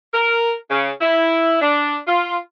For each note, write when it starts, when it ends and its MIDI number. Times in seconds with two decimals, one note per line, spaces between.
0.13 0.53 70
0.71 0.90 49
1.01 1.58 64
1.61 1.98 62
2.08 2.36 65